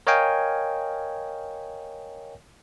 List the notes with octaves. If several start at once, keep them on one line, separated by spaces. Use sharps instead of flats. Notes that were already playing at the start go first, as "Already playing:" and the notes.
A#4 C#5 D#5 F5 G5 G#5